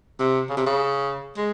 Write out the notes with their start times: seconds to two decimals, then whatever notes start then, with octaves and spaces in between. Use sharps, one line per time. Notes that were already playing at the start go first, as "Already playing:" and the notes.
0.20 C3
0.49 C#3
0.57 C3
0.66 C#3
1.37 G#3